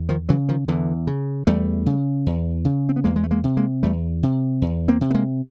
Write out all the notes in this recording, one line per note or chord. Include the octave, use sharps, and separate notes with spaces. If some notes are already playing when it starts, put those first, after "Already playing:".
Already playing: E2
D#3 F3
C#3 E3 F#3
D#3 F3
E2 D3 E3
C#3
E2 G3 A3
C#3
E2
C#3
C4
B3
E2 G#3 A#3
G#3
A3
G#3 A#3
C3
G#3 A#3
E2 G3 A3
C3
E2
A#3 C4
C3
B3
G#3 A#3